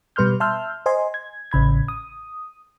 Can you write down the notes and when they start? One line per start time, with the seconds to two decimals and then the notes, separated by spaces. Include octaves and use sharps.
0.16 B2 G3 B4 C6 F6 G6
0.40 E5 A5 C6 E6 F6 G6
0.86 C5 D#5 G#5 C6
1.14 G#6
1.51 A1 C#3 B5 G#6
1.88 D#6